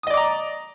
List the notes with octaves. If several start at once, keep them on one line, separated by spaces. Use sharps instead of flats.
D5 D#5 A#5 D6 D#6